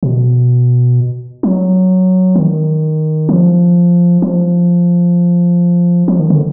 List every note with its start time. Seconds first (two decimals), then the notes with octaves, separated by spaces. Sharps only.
0.03 B2
1.43 F#3
2.36 D#3
3.29 F3
4.22 F3
6.08 F3
6.20 D#3
6.30 D3